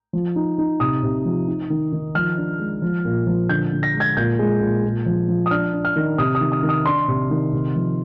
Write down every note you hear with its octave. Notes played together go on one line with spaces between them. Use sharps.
F3
D#4
D#4
C3 D#6
C3
F3
D#4
D#3
D#3
F3 F6
D4
G#3
F3
A#2
F3
D3 G6
D3
A#6
G#3
G#6
A#2 G6
G#3
A#2
A#2
F3
F3
D#6
D4 F6
D4
F6
D#3
C3 D#6
D#6
D#3
D#6
D#3
D#6
D4 C6
C3
D#3
C3
F3